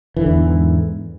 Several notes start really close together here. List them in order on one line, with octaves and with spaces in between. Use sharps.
E3 D3 E2 G#2